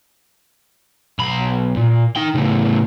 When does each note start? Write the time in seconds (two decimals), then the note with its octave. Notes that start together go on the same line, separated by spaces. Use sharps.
1.19 B1 B5
1.77 A#2
2.16 D#4 G5
2.35 A2 C#3